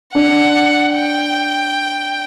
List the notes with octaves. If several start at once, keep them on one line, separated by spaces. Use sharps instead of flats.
D4 F#5
G5